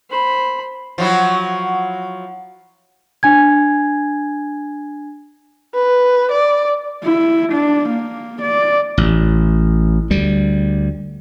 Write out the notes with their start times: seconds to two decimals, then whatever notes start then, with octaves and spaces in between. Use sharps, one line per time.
0.10 C5 B5
0.98 F3 F#3 E4
3.23 D4 G#5 G#6
5.75 B4
6.31 D5
7.03 E4
7.52 D4
7.89 A#3
8.42 D5
8.98 A1
10.10 D2 G3